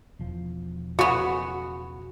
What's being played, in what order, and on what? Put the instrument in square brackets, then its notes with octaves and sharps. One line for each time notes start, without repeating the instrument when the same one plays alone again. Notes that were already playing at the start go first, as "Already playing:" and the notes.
[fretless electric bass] E1 F3
[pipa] C#3 B3 [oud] F#4